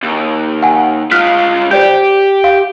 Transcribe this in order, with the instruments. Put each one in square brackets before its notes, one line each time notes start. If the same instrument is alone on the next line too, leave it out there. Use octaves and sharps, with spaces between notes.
[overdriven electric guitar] D#2
[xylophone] F#5 G#5
[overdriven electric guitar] G#3 F4 [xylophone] F6 F#6 B6
[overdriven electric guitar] G4 [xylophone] C5 D5 G6
[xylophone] F5